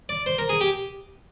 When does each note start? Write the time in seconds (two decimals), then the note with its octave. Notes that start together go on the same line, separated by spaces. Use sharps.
0.09 D5
0.26 C5
0.38 A#4
0.49 G#4
0.61 G4